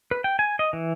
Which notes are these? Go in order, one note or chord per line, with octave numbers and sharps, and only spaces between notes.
B4
G5
G#5
D#5
E3